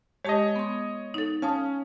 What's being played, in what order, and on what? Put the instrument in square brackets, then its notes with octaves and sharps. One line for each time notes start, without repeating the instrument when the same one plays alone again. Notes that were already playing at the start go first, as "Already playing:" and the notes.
[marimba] G#3 G4 A5 [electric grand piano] C#5 D#5
[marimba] B3 C6
D#4 A4
[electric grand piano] C#4 [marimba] F5 A5 D#6